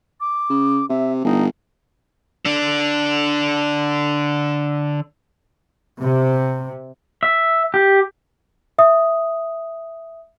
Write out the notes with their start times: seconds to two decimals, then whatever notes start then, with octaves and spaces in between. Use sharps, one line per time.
0.20 D6
0.50 C#3
0.90 C3 E5
1.24 G1 D#4
2.45 D3 D4
6.02 C3
7.23 E5
7.74 G4
8.79 E5 D#6